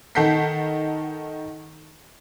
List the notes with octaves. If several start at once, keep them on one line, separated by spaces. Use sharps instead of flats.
D#3 A4 F#5 G6 B6 C7